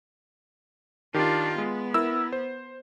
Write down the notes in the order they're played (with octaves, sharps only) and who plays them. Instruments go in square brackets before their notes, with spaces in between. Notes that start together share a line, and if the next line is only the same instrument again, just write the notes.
[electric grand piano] D#3 G4 C7 [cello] D4 F4
[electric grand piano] G#3 [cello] B3
[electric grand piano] E4 A#4 E6
C5